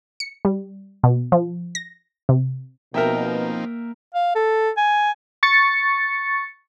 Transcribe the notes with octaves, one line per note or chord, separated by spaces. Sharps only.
C#7
G3
B2
F3
A#6
C3
B2 F3 A#3 C4 D#4 A#4 E5 G5
F5
A4
G#5
C#6 A6 C#7